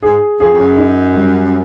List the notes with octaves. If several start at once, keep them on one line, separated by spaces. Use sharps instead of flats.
G#2 G#4
F2 G#4
F2
F#2
D#4
G3